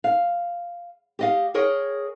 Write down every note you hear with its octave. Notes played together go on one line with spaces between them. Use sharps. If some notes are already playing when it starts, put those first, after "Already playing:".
F5
G4 D#5 F5
G#4 A#4 C#5 D#5 G5